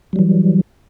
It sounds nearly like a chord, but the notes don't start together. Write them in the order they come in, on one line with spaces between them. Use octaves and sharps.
F#3 G3 E3